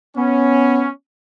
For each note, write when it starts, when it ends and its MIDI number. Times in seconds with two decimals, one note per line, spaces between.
0.17 0.88 59
0.17 0.90 61